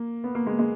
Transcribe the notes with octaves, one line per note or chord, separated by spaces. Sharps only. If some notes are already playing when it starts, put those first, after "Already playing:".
Already playing: A#3
B3
A#3
G#3
G#3